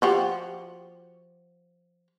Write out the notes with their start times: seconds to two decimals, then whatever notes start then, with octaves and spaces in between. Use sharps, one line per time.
0.02 F3 F#4 G4